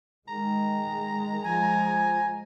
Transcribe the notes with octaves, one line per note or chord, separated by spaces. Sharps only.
D#3 G#3 A#5
F3 G#5